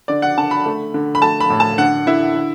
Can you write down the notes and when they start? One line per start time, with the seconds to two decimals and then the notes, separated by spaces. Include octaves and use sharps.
0.08 D3 D5
0.22 F#5
0.37 D3 A5
0.51 B5
0.66 A3
0.94 D3
1.15 B5
1.22 A3 A5
1.40 B5
1.50 A2
1.60 A5
1.78 D3 F#5
2.07 D3 E4
2.35 D3